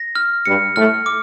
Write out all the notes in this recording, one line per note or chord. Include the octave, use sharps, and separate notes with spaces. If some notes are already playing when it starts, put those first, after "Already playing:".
Already playing: A#6
F6
G2 G3 C#7
A2 A3 F6
D6